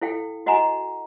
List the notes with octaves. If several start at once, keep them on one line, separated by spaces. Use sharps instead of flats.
E4 A4 F5 G5
F#4 D#5 F#5 G#5 A#5